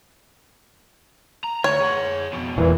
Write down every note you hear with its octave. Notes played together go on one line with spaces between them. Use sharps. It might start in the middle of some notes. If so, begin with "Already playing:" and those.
A#5
D2 C#5
G#4 F#5
F2 B2
E2 A#2 E3